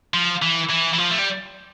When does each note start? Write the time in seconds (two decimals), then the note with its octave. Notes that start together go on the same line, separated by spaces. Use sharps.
0.14 F3
0.42 E3
0.70 E3
0.93 E3
0.98 F3
1.11 A3
1.19 G3